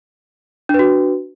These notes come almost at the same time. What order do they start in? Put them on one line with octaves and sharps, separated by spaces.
D4 B4 F#4